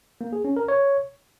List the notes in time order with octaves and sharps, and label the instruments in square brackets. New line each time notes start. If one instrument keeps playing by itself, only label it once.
[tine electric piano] A#3
G#4
C#4
A#4
C#5